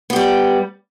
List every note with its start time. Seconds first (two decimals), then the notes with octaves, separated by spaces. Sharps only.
0.10 B3
0.13 G4
0.16 G3